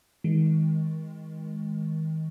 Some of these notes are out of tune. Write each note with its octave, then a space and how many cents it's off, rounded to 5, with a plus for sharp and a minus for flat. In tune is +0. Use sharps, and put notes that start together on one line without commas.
D#3 +35 G#3 +0